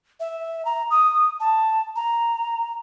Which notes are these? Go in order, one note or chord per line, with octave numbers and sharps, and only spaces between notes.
E5
A#5
D#6
A5
A#5